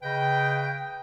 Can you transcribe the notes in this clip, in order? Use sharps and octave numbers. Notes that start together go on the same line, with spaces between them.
C#3 B4 D#5 G5